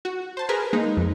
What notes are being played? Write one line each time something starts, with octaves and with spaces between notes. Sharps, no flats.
F#4
C5 A5
G#4 A#4 B4
G#3 A#3 D#4
F2